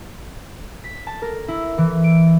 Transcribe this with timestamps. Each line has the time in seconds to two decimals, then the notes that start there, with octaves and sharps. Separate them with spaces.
0.84 B6
1.07 A5
1.22 A#4
1.48 E4
1.78 E3
2.04 D7